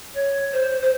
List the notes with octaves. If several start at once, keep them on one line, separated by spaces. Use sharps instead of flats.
C#5
C5
C5